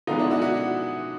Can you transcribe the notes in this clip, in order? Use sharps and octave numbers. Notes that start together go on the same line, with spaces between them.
D3 F3 G#3 B3 D#4
D4 E4
E4 F#4
E4 F#4